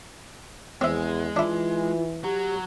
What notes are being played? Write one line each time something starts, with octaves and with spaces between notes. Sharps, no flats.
E2 G#3 C4 E5
E3 D4 E4 F4
F#3 G4